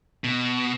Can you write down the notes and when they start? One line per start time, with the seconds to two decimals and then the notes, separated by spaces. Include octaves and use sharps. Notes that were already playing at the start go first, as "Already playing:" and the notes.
0.24 B2